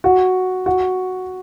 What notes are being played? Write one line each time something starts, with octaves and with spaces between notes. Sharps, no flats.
F#4
F#4